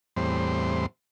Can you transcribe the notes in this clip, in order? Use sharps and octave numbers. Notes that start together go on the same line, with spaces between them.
E2 A2 G3 C4 C6